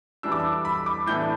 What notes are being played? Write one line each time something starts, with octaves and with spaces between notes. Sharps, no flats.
E3 G3 D4 E6
D6
E6
B5
D6
A2 E3 B3 D4 G6